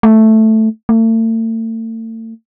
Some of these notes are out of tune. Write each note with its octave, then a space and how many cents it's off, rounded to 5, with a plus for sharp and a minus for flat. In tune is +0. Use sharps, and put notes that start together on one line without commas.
A3 +0
A3 +40